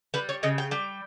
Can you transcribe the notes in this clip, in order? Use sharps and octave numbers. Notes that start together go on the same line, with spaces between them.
G3 B4
C#5
C#3 D#5
G5
G3 G5